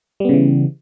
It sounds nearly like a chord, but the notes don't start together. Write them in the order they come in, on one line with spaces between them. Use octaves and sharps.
G3 B3 C#3 E3